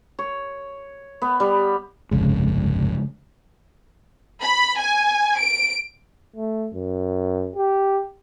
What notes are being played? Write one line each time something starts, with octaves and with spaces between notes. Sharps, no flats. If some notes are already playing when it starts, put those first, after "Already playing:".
C#5
B3
G3
G1 C2 F2 C#3 G#3
B5
G#5
D7
A3
F#2
G4